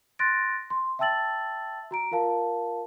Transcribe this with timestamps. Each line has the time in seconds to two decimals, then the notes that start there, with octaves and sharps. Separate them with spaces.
0.19 C6 F#6 A6 A#6 D7
0.70 C6
0.99 E5 G5 A5 E6 A6 F#7
1.91 F#4 A#5 D7
2.11 F4 A#4 F5 A5